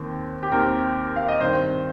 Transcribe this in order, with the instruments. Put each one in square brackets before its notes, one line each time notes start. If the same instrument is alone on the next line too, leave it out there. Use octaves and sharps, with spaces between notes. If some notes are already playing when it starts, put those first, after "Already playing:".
Already playing: [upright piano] D#2 D#3 C4
G4
D#2 D#3 C4 A#4
F5
D#5
G2 D#3 C4 C5